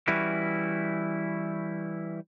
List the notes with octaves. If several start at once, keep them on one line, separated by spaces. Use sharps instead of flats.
E3 G3 C#4 E4 F#4